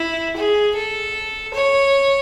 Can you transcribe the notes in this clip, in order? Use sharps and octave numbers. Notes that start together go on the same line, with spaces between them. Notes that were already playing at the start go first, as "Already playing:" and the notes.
Already playing: E4
G#4
A4
C#5